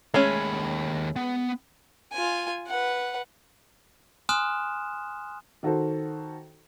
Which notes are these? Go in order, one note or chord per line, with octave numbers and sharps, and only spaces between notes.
D#2 G#3 A3 C#4 B5
B3
F4 G#5
B4 F#5
G#5 C6 D#6 F6 F#6 E7
D#3 F#4 A4 C5